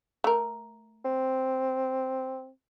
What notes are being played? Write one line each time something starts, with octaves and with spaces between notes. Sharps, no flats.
A3 A#4
C4